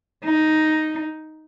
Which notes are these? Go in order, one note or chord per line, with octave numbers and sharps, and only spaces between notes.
D#4